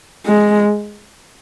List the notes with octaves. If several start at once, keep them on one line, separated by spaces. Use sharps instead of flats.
G#3